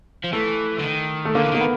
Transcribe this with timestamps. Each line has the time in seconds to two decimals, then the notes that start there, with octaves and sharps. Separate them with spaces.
0.24 F3
0.33 E3 A3
0.79 D3
0.84 D#3
1.25 A3
1.35 D3 A#3
1.44 E3
1.52 D#3 A#3
1.60 B3